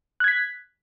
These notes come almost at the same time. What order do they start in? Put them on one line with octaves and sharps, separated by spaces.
F#6 G#6 B6